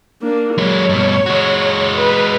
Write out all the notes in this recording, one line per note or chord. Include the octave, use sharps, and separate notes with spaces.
A#3 D4
F#3 G#3 C#5
G2 B2
G#3 F#4
B4